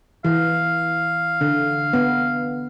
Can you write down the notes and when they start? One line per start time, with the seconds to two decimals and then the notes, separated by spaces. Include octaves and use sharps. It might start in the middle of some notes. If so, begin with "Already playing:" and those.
0.25 E3 F5
1.41 D3
1.93 B3